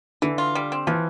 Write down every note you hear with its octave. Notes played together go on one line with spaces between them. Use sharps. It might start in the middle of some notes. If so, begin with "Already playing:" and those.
D3 E3
F4
G3
C4
E3 F3